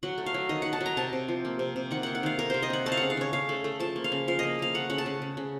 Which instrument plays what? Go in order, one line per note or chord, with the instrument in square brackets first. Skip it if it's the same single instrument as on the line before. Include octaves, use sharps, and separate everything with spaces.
[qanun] F#3 F#5
A3
F5
F#3
D#3 D#5
D#3 F#5
A5
F#3
A#5
C3 A5
C3
F3
A#3
C3
C3
D#3 F#5
A#3 F#5
F#5
D#3 F5
A#3 A#4
C3 C5
D#5
D#3 F#5
A3 A5
F5
C#3 F#5
F5
C#3 C#5
C#3 F5
A3
A3
F3 A5
A#3
F5
C#3
F3 F5
A#3 D#5
A#3 F5
A3 F#5
C#3 F#5
A5
C#3
C#3
C#3